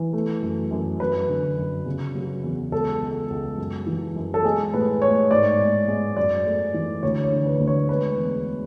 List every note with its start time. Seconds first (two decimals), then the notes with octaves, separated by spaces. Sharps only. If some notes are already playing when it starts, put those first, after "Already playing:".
Already playing: E3
0.13 A3
0.42 F#2
0.71 F#2
1.00 F#2 B4
1.29 D3
1.58 F#2
1.86 C#3
2.15 F#3
2.44 E2
2.72 C#2 A4
3.01 C#2
3.30 C#2
3.58 F#2
3.87 E3
4.16 F#2
4.34 A4
4.44 G#3 G#4
4.73 A2 B4
5.02 A2 C#5
5.31 G#2 D5
5.59 G#3
5.88 G#3
6.17 F#2 D5
6.45 A3
6.74 E3
7.03 D2 C#5
7.24 C#5
7.32 D3
7.46 B4
7.60 D2
7.67 C#5
7.89 G#3 B4
8.17 E2